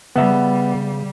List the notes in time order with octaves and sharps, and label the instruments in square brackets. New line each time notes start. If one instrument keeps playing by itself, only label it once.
[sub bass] C#3 [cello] G3 [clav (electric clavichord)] B3 E5